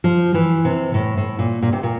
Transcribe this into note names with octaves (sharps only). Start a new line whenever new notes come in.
F3
E3
C3
A2
A2
A#2
A#2
C3
A#2